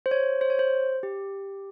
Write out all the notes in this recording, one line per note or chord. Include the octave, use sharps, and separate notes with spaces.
C5
C#5
C5
C#5
C5
G4